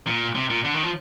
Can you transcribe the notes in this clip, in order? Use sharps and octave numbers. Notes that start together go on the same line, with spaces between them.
A#2
C3
A#2
D3
D#3
F3